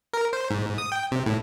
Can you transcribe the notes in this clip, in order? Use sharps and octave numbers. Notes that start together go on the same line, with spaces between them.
A#4
C5
G#2
D#6
G5
C3
A2